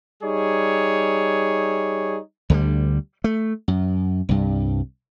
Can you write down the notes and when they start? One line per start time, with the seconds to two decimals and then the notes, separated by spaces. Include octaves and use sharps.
0.23 G3 D#4 G#4 C#5
2.50 D2 D3 D#3 G3
3.24 A3
3.68 F#2
4.29 C2 G2